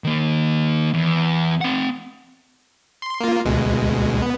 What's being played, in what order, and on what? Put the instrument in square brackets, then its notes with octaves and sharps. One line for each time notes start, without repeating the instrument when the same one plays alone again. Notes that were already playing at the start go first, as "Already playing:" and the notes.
[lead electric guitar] D#3 A#3
E2
C4 F#5
[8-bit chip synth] C6
A#3 F4
D2 B2 G#3
B3